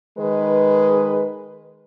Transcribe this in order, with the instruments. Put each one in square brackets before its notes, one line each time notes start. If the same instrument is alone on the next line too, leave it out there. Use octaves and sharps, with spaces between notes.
[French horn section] D#3 G#3 B4